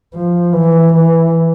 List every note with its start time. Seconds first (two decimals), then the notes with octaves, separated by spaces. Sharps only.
0.14 F3
0.53 E3
0.94 E3